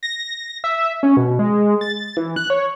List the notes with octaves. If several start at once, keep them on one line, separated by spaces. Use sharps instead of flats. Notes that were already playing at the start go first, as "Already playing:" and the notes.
A#6
E5
C#4
B2
G#3
A6
E3
F#6
C#5